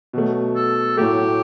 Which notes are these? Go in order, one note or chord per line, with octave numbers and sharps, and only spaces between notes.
B2 F#3 A3
A4
A2 F#3 A3 G4